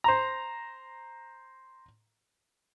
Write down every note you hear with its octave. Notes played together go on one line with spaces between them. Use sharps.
C5 A#5